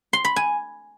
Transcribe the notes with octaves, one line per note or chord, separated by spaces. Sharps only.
C6
B5
G#5